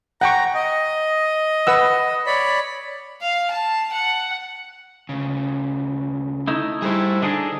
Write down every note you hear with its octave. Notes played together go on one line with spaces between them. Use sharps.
F#5 G5 A#5 C#6
D#5
B4 F#5 E6
C#5 D5 B5
F5
A5
F#5
D2 C#3
A3 D#4 E4
G3 A3 E4 G#4 C5
D3 D4 D#4 G#4